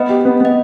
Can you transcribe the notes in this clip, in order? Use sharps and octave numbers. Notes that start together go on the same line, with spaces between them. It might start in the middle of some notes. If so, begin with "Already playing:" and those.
Already playing: B3 B4 D#5
G4
B3
B3 D#5